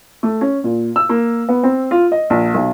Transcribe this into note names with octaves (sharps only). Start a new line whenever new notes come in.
A3
C#4
A#2
E6
A#3
B3
C4
F4
D#5
A#1
B1